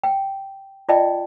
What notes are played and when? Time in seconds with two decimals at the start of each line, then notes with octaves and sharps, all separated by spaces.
0.04 G5
0.89 F4 D5 D#5 G5 A5